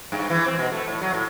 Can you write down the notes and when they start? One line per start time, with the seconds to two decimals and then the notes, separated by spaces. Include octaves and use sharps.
0.12 G2
0.30 E3
0.46 C4
0.58 B2
0.72 A3
0.87 A2
1.01 F#3
1.14 A2